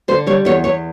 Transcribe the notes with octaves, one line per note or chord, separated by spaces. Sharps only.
D3 C5
G3 C#5
E2 C#5
E2 C#5